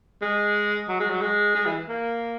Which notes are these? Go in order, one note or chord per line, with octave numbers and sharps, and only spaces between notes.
G#3
F#3
G#3
F#3
G#3
G#3
E3
A#3